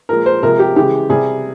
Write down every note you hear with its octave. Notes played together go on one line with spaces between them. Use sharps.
A#2 F3 G#3 A#4
C5
C3 F3 G#3 A#4
G4
C#3 E3 G#3 G4
C3 G3 G#4